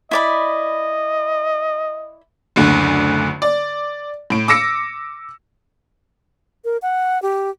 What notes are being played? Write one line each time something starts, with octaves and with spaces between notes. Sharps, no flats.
E4 D5 D#5 B5
F#1 D2 D3
D5
A2 D7
D6 E6 A#6 C#7
A#4
F#5
G4